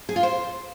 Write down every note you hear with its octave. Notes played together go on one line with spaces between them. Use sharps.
G#4
F4
C5